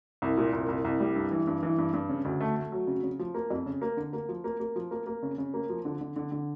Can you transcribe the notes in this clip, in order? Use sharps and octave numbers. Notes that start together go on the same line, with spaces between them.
C2
A#2
C2
C2
C2
G3
G2
E3
G2
E3
G2
G2
C#3
D2
A3
A3
F#3
C#3
C#3
F3
A#3
F2
C#3
A#3
D3
A#3
F3
A#3
A#3
F3
A#3
A#3
C#3
C#3
A#3
F3
D3
D3
D3
D3